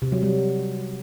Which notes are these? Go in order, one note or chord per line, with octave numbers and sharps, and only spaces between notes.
C3
F#3
G3